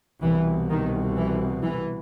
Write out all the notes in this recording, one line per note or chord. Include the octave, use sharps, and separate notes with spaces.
C2 B2 E3
D#3
E3
E3